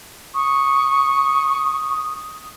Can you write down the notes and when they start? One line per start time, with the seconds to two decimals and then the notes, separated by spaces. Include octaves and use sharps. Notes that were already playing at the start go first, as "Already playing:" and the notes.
0.34 C#6 D#6